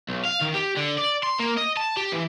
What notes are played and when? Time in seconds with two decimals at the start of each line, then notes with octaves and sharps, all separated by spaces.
0.09 B1
0.25 F5
0.42 D#3
0.55 G4
0.77 D3
0.98 D5
1.23 C6
1.39 A#3
1.57 D#5
1.77 A5
1.97 G4
2.12 E3